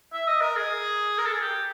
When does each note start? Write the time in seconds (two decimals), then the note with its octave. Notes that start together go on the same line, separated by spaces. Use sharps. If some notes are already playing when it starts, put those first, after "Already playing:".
0.13 E5
0.27 D#5
0.41 A#4
0.56 G#4
1.18 A#4
1.25 A4
1.32 G#4
1.40 G4